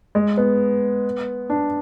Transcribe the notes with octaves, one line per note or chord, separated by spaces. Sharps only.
G#3
B3
D4